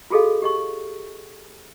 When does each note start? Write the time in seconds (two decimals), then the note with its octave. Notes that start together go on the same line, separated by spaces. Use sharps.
0.10 F4 F#4 G#4 A4 D#5 F5
0.42 G4 D#5 C#6